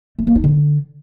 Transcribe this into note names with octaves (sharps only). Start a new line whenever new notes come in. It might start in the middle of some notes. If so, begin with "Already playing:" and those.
A3
A#3
D#4
D3